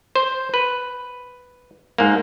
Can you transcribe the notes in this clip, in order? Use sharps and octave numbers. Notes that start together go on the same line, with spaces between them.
C5
B4
G#2 A#3